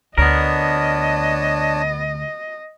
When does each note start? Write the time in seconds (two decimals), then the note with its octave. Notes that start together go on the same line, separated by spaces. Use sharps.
0.18 D2 B3 D4 A#4 C#5 D#5 A5